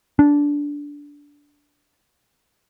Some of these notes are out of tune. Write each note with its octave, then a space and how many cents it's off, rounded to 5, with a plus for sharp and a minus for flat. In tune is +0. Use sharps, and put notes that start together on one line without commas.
D4 -15